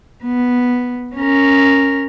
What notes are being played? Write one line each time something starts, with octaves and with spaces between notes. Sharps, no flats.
B3
C#4 A#4